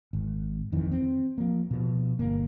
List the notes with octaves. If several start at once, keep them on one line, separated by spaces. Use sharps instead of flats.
G#1
F2 D#3 E3
C4
F3 A#3
B2 F3
G1 A#3